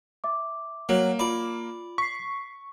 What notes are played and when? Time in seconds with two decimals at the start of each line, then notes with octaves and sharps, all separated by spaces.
0.24 E5 D6
0.89 F#3 A#3
1.19 F4 D5 B5
1.98 C#6 B6 C7